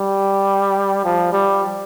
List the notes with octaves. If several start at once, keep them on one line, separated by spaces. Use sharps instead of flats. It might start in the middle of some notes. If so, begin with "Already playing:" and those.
Already playing: G3
F3
G3